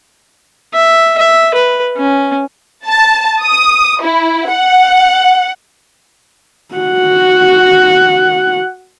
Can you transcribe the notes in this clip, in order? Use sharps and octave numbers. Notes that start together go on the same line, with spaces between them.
E5
E5
B4
C#4
A5
D#6
E4
F#5
F#4 F#5